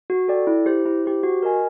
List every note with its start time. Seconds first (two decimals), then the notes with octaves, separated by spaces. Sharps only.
0.10 F#4
0.28 A4 D5 G5
0.47 E4
0.66 G4 C5
0.85 E4
1.05 G4 C5
1.23 F#4
1.43 A#4 D#5 G#5